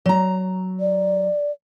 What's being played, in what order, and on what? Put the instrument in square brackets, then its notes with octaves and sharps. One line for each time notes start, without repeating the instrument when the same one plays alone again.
[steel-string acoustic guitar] F#3 A#5
[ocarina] D5